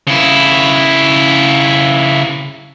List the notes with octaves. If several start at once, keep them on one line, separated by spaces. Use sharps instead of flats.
C#3 E4